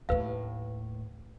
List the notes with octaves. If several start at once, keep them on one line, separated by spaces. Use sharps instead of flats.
D#2 A2 B4 F5